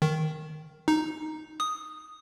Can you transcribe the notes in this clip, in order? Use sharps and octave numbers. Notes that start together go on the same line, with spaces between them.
D#3
D#4
D#6